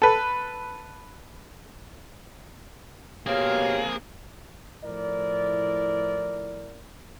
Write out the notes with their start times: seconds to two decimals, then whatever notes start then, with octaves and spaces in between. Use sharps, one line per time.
0.02 A4 B4
3.26 B2 A#3 C4 G4 G#4 C#5 F5
4.84 A2 F3 E4 A#4 D5